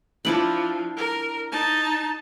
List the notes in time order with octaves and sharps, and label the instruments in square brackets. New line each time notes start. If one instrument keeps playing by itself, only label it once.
[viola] F3 [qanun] D4 E4 B5
[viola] A#4
D#4 A5